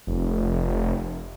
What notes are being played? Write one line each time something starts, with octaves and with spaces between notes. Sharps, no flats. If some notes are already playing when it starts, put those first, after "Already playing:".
F1